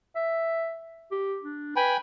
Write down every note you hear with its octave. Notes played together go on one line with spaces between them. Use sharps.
E5
G4
D4
B4 G5 G#5 B5